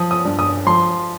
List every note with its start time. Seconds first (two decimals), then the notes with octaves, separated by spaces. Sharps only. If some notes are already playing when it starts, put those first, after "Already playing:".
Already playing: F3 D#6
0.11 D#6
0.25 G2
0.39 D#6
0.66 F3 C6